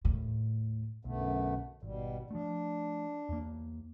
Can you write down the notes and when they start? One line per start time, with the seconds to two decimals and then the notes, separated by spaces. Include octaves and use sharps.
0.05 D#2 A2
1.05 B1 F#2 D3 A3 B3
1.83 G#1 B2 G3
2.31 F3 A3 D4
3.29 E2 A#3